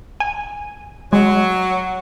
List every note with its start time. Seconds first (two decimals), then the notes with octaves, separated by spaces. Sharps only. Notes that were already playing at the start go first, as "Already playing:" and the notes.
0.20 G#5
1.13 F#3 G#3